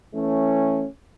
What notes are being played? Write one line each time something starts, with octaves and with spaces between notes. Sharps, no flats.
E3 A3 C#4